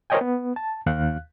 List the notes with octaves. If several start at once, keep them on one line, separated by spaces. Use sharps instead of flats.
A#4 C5 C#5 D#5 G5 G#5
B3
A5
D#2 F5 F#6